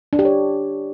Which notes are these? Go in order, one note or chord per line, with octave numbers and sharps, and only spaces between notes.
D4
G4
C#5